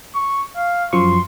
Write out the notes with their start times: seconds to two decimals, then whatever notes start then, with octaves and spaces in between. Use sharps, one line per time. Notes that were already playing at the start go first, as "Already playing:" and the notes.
0.15 C#6
0.56 F5
0.93 F#2 F3 C6 C#6